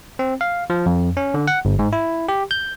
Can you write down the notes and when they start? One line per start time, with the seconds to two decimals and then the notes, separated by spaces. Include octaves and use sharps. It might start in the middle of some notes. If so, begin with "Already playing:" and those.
0.19 C4
0.41 F5
0.70 F3
0.86 F2
1.17 C#4
1.34 D3
1.48 F#5
1.65 G1
1.79 G#2
1.93 E4
2.29 G4
2.51 G6